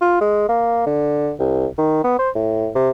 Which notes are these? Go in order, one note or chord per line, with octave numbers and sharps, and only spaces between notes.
F4
G#3
A#3
D3
C2
D#3
B3
C5
A2
C3